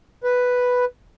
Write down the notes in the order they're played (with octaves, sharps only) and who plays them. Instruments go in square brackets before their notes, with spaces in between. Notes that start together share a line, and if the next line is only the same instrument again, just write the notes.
[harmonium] B4